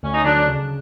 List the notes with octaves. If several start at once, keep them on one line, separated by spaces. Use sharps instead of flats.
D2 C#4
D#4
D3 F#3 D4
C#3